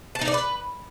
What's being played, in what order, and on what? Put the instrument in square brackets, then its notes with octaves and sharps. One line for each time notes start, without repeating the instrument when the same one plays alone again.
[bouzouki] A5
D#4
D5
B4